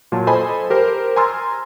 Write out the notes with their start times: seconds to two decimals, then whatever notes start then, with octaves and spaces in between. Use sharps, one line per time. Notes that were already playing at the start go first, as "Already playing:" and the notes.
0.12 A#2 F#3 F4 A5
0.27 A4 C5 D#5 G#5 A5 B5
0.70 G4 A#4 C5
1.16 G#5 A#5 C6 E6 F6 A6